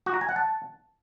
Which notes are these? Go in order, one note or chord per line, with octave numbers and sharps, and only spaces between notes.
F#4
A#5
G#5
F#5
A5